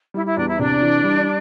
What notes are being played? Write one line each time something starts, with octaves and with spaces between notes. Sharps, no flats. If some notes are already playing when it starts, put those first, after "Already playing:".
G3 E4
E4
E2 D4
E4
C3 D4
E3
G3